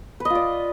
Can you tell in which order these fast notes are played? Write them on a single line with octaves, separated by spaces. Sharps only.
B4 D#5 F4 D5